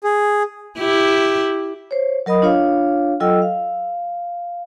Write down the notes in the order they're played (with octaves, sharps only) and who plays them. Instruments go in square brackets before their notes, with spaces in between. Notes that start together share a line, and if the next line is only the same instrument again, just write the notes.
[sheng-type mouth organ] G#4
[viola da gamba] E4 G4
[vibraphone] C5 C#5
F#3 A#4 D#5 B5 D#6
D4 F4 C#5 F5
F#3 F4 A4 D#5 G5 E6
F5